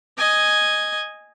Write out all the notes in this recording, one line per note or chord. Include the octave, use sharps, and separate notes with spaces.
D#5 G#5